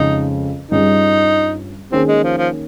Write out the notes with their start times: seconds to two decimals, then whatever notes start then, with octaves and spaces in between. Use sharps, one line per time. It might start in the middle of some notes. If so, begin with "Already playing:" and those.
Already playing: F2 C#3 G#3 D#4
0.71 G2 G3 C#4 D#4 F4 G#4
1.92 D#3 A#3 C4 C#4 G#4
2.08 G#3
2.23 F3
2.38 F3